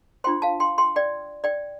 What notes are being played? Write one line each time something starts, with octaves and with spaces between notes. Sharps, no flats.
D4 F4 C5 G5 C6
F5 A5
G5 C6
G5 C6
D5 G5
D5 G5